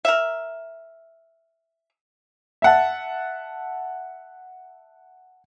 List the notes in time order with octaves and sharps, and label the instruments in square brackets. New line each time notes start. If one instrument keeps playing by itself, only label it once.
[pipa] A#4 E5
[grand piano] E5 F#5 A5